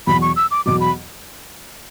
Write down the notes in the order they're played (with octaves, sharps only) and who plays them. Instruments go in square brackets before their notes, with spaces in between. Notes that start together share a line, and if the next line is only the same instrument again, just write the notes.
[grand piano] E2 B2 F#3 [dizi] B5
[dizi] C#6
E6
D6
[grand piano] E2 B2 F#3 [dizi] D6
[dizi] B5